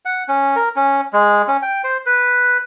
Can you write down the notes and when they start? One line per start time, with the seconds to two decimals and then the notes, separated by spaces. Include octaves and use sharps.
0.05 F#5
0.28 C#4
0.56 A#4
0.76 C#4
1.13 G#3
1.48 C#4
1.62 G5
1.84 C5
2.06 B4